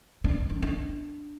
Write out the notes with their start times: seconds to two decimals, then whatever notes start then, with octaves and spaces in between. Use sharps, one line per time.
0.24 D4
0.50 D4
0.62 D4